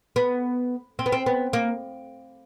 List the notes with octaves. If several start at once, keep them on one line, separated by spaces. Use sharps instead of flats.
B3
C4
B3
C4
B3
A#3